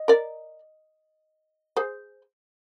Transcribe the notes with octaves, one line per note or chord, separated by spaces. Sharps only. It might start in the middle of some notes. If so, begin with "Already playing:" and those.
Already playing: D#5
A#4 D5
G#4 C5